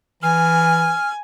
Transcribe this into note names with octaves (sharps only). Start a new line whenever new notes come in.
E3 G#5 F6